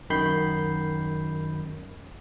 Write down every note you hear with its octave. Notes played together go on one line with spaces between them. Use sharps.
F#2 D#3 B5 G6 C7